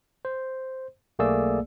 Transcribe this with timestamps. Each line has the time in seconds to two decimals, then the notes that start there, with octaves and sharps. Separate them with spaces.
0.25 C5
1.19 B1 A3 A#3 G#4 D5 E6